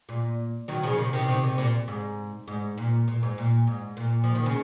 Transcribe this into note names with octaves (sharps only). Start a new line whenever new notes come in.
A#2
D#3 F#3
C#3 F3
C3 D#3
C3 D#3
C3 D#3
C3
A#2
G#2
G#2
A#2
A#2
G#2
A#2
G#2
A#2
F3
D#3
C#3